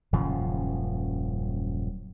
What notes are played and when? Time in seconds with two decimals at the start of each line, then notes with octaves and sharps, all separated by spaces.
0.13 D#1 F#2 C#3 F3